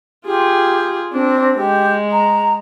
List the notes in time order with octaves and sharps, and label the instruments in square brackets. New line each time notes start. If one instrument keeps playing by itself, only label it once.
[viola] F4 G#4 [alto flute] G4
[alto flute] C4 [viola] D4
[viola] G#3 [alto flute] G4
[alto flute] A#5